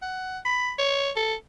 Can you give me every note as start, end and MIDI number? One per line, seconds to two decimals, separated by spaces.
0.02 0.39 78
0.45 0.72 83
0.79 1.11 73
1.16 1.34 69